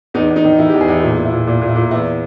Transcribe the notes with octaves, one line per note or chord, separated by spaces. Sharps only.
E2 D#4
E2
D#4
D#3
D#3 E4
G4
E2
G#4
E2 E4
A#2 E4
A#2
E4
A#2
A#2
A#2
E4
A#2
E2 E4